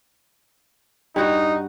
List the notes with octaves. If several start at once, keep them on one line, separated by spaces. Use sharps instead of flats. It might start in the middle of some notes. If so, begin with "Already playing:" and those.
G2 D#4 F#4